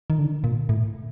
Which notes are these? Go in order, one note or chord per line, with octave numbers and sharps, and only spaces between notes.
D#3
D3
A#2
A2